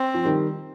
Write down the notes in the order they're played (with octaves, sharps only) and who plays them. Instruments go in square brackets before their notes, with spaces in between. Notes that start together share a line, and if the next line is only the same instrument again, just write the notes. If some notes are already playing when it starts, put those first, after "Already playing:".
Already playing: [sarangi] C4
[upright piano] F3
D#3 G3